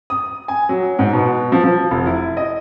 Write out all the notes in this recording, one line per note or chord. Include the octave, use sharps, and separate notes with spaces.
D#6
G#5
F#3
G#2
B2
F3
F3
F1
E4
D#5